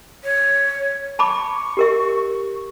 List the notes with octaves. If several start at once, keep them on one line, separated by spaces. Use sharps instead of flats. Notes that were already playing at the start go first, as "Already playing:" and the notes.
C#5
A5 B5 C#6 D6
G4 A#4 E5